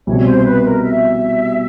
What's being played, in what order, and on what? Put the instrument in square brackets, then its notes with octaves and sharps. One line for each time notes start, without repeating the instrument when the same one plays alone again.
[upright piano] C2 B2 G3 C4 [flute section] C#5
[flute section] C#5
C5
B4
A#4
E5